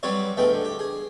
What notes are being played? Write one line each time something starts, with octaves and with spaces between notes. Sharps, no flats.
F#3 G3 C4 B4 C#5 D5
D2 G#3 A3 B3 G5
D3
G4
G#4